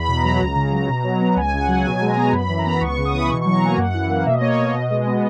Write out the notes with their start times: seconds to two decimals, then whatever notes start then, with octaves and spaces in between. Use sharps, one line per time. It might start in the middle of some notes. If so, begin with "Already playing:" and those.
Already playing: E2 B5
0.08 B2
0.17 A#5
0.24 F#3
0.40 C#2
0.56 C#3
0.72 F#3
0.89 B2
1.04 F#3
1.21 B3
1.36 C#2 G#5
1.51 C#3 G#5
1.60 F#5
1.68 F#3
1.84 B2 G#5
2.01 G#3
2.08 A#5
2.17 B3
2.33 F#2 B5
2.48 E3
2.58 A#5
2.66 B3 B5
2.81 C#2 C#6
2.98 C#3
3.05 D#6
3.13 E3 B5
3.29 B2 C#6
3.41 F#3 C#6
3.53 A#5
3.61 A#3 G#5
3.77 F#2 F#5
3.94 E3
4.09 A#3
4.26 B2 E5
4.34 D#5
4.41 A#3 C#5
4.49 D#5
4.58 B2
4.74 B2
4.91 G#3
5.07 B3